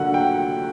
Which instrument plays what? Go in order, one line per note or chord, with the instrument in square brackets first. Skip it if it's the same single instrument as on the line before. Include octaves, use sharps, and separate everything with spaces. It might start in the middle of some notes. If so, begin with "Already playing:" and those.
Already playing: [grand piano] D3 F#3 A#3 [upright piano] F#5
[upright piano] G5